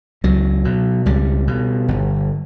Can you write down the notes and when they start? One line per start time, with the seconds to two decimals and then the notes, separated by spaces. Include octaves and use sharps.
0.24 C#2 F#3
0.65 B2
1.06 C#2 G3
1.47 B2
1.88 G1